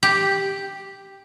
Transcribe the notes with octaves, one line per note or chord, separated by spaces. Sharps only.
G4